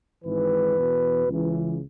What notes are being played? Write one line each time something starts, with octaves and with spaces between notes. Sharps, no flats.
G#1 G#2 E3 B4
E2 B2
C#2 C#3 E3